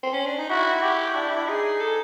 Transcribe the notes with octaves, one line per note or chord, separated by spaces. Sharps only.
C4
C#4
D4
D#4
E4 F#4
G4
D4
D#4 G#4
A4